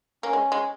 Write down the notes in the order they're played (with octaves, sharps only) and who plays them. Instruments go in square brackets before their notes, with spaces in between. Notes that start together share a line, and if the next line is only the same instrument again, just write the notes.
[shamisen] A#3 [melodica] C#4
[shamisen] G#3
G#3